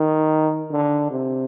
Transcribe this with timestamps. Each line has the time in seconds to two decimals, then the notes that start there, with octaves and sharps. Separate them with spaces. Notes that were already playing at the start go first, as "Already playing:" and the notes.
Already playing: D#3
0.70 D3
1.11 C3